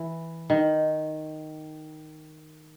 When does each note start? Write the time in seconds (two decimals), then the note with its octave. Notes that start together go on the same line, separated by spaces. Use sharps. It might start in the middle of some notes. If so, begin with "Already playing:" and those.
Already playing: E3
0.50 D#3